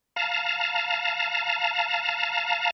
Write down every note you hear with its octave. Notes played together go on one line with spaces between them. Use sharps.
F5 A5 A#5